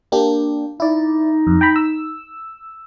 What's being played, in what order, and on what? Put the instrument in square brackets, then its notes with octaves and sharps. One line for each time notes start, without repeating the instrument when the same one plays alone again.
[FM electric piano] A#3 D4 G4
[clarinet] D#4 [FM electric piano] E4 D5
[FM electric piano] F2
G5 A#5 B5
E6